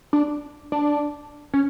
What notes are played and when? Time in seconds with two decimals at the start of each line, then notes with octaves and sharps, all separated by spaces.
0.13 D4
0.72 D4
1.54 C#4